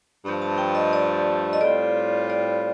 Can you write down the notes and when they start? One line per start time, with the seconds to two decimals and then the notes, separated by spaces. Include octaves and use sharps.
0.24 G2 F3 A3
0.42 A5
0.58 G5
0.75 D#5
0.93 D5
1.53 D#5
1.61 A2 G3 C4 F4 D5
2.30 D5